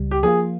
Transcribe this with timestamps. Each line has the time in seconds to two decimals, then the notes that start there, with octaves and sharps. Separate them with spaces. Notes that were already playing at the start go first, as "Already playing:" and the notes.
Already playing: C#2 G3
0.11 G4
0.23 F3 A#3 F4 G#4